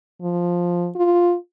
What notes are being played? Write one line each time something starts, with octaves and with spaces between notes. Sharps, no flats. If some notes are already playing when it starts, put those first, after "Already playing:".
F3
F4